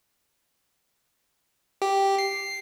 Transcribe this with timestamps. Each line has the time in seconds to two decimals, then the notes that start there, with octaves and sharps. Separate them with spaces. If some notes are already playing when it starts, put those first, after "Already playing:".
1.82 G4
2.18 C7